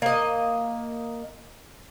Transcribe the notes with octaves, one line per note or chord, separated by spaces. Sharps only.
A#3 D#5